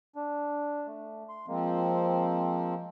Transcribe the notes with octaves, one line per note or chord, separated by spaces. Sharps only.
D4
A3
C6
F3 G#3 A#3 C4